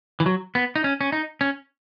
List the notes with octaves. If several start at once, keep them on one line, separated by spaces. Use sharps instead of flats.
E3
F#3
B3
D#4
C#4
C#4
D#4
C#4